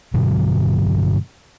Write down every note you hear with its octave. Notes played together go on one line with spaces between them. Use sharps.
G2 B2 D3 F#3